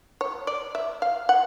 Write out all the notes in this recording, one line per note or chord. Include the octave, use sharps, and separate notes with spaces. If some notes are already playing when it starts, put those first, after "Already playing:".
C#5
D5
E5
F5
F#5